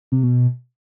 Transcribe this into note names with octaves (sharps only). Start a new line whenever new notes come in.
C3
B2